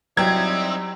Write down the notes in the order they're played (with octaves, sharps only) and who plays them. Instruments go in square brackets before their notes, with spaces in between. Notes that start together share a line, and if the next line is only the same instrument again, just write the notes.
[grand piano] F#3 G5 [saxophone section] G3 D#4 E4 [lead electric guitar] C4 [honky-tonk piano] G#6